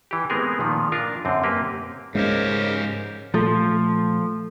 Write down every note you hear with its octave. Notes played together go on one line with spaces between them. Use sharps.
E3 G4
G#3 A3 B3 C4 G#4 A#4
A#2 D#3 F3
D4 F4 A#4
F#2 D3 C4
A#3 C4 G4 B4
G#2 C#3 G#3 C#4 G4 A#4 C5
A#2 F3 A3 A4